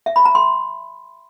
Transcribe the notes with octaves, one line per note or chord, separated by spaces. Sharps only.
E5
B5
A#5
C6